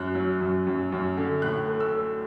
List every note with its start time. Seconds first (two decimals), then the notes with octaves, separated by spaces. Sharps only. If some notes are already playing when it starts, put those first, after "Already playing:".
Already playing: F#2 F#6
0.15 F#3
0.40 F#2
0.67 F#2
0.92 F#2
1.17 D3
1.42 A2 F#6
1.68 A3
1.80 E6
1.94 A3